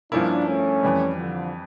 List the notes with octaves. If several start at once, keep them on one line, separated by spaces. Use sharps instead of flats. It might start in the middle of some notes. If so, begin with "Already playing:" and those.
G2 F3 A#3 C#4 D4 E4 A#4
A3 C#4
F2 E3 G3
D3 F3